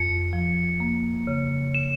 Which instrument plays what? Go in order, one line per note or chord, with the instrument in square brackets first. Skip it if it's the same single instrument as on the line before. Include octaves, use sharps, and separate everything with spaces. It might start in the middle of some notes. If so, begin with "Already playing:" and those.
Already playing: [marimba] F2 [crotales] C#7
[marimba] F3
A#3
C#3
[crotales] E7